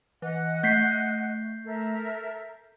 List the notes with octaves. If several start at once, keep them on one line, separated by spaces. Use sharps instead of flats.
E3 D#5 F#5 F#6
A3 G6 B6 C7
A4 A#4 E5